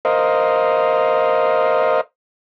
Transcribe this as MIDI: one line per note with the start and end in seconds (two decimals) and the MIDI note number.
0.05 2.01 70
0.05 2.01 72
0.05 2.01 75
0.05 2.01 77